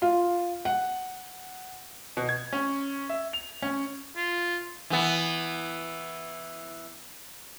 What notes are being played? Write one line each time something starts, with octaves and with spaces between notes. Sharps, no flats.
F4
F#5
B2
G#6
C#4
E5
F7
C#4
F4
E3 B3